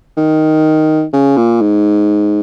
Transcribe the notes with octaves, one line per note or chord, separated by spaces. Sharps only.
D#3
C#3
A#2
G#2